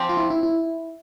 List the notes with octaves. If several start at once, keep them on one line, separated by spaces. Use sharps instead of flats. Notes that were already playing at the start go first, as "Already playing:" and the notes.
Already playing: F3 C4 G4
F4
E4
E4
E4